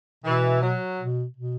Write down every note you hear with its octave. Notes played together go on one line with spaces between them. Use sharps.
B2 E3
F#3
B2
B2